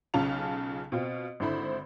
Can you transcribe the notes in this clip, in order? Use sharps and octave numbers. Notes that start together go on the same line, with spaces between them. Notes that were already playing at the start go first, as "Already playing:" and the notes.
B1 C#3 C#4 F4 A5 F7
B2 C4 F4
G#1 D3 E4 C5 B5